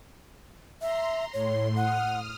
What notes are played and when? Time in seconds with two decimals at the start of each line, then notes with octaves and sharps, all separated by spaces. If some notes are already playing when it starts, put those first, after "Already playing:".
0.81 E5 A#5 C6
1.33 A2 C#5 C6
1.76 F#5 D#6 F6